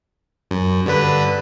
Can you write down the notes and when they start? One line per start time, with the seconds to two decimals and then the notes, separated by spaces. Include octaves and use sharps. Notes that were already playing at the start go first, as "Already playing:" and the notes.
0.51 F#2
0.86 G2 D3 B4